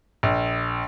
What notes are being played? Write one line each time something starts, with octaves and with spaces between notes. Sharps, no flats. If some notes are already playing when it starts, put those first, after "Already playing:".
A#1